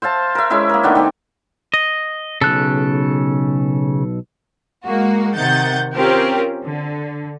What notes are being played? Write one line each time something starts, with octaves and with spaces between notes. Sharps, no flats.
C5 E5 F5 A5
A#4 E5
G#3 C#4 E4 E5
A#3 A#4
D#3 A3 B3 D4
D#3 C4 D5
D#5
B1 C#3 A4 F#6
G#3 A#3 F#4
C3 D#3 F#5 G6 A6
C4 C#4 F4 G4 A#4
D3